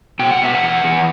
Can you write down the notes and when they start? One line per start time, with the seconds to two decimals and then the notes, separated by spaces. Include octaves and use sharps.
0.19 B2 G5
0.31 F#5
0.42 B2 E5
0.55 F#5
0.62 E2
0.84 E2